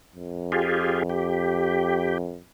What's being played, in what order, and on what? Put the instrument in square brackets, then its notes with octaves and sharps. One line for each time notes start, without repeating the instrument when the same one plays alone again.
[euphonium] F2
[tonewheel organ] F4 G4 G#4
G4